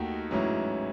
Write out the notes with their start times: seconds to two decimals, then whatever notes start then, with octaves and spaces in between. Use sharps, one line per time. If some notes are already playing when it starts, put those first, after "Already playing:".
Already playing: D#2 D#3 A3 D#4 F#4
0.31 A1 G#2 F#3 C#4 E4